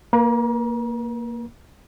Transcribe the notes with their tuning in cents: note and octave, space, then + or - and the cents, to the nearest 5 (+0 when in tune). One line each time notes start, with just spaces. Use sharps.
A#3 +0 B4 -35 A#5 +35